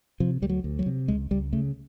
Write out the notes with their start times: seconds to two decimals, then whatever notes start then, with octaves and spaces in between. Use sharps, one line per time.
0.20 C3 F3
0.42 D2 G3
0.49 F#3
0.64 D2
0.79 F#3
0.86 C3
1.08 C#2 G#3
1.31 C#2 G3
1.53 C#3 A3